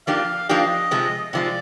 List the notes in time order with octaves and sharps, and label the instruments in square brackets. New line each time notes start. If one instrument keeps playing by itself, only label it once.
[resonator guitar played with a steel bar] F3 A#3 D4 G4 [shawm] F5
[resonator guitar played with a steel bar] F3 A#3 D4 G4 [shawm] D#5
[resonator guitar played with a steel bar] C3 F3 G#3
[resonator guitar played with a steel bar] C3 F3 G#3 [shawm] D5